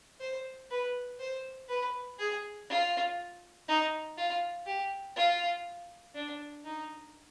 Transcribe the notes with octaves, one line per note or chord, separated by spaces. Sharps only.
C5
B4
C5
B4
G#4
F4
D#4
F4
G4
F4
D4
D#4